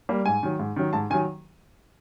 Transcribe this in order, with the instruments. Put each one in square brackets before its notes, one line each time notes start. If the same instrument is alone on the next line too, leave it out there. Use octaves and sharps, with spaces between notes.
[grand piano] G3 A#3
G#2 G#5
D#3 F#3
G#2
D#3 F#3
G#2 A5
D#3 G#5
F#3